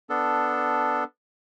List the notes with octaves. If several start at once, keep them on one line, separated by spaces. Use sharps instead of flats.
B3 D4 A4